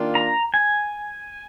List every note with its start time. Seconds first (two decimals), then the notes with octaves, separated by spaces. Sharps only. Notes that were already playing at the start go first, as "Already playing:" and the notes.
Already playing: D#3 A#3 D4 F4
0.15 A#5
0.54 G#5